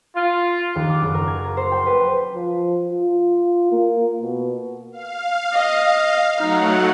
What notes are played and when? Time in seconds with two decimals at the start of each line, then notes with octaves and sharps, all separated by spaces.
0.15 F4
0.75 D#2
0.90 D6
1.02 F#1
1.14 A#4
1.27 G#6
1.45 A#5
1.57 C5
1.71 G5
1.86 B4
2.35 F3
2.92 F4
3.72 A#3
4.21 B2
4.92 F5
5.52 D#5
6.38 F#3 A3 D#4 F#5